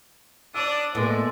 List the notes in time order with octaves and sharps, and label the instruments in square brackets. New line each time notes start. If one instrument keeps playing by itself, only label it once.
[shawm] D4 [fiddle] D5 D#6 [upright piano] E6
[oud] A2 [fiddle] G#3 [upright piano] A#3 B3 [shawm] D5